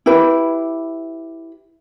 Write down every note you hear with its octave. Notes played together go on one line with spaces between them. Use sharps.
E4 G4 B4 B5